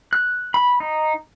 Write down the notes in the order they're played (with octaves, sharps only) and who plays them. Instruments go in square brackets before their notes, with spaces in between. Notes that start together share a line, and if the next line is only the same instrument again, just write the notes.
[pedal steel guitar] F#6
B5
D#4